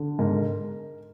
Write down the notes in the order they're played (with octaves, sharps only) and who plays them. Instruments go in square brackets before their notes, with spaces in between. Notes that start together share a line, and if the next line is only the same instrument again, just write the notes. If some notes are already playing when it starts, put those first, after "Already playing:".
Already playing: [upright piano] D3
G#2 A#4